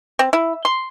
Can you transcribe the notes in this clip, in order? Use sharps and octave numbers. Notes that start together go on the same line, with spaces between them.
C4
E4
C6